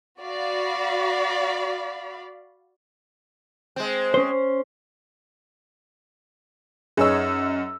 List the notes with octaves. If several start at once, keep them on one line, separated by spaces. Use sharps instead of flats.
F#4 D5 F5 B5
G#3 C4
C#4 C5
F#2 D#4 G#4 B4 C#5 E6